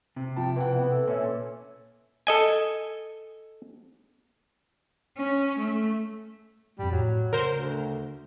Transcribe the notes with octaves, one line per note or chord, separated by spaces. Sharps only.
C3 C4
F3 G5 A5
E3 C4 F#5
B3
A4
A#2 C#4 B4 E5
A4 D#5 G#5
C#4
A3
F2 G#2 G3
A2 F#3
C#3 A#4 C5
D2